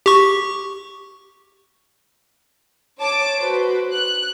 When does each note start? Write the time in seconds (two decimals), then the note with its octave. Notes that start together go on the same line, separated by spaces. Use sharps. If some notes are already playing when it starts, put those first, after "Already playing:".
0.06 G4 C#6
2.99 C#5 A5 D6
3.39 F#4 B4 C5
3.92 F#6